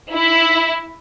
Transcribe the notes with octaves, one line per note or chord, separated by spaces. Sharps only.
E4